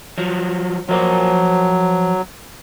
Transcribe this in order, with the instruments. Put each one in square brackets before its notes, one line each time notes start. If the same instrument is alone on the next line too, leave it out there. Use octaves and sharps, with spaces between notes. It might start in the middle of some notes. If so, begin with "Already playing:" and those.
[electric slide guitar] F3 F#3
[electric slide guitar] F3 A#4 C5 [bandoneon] F#3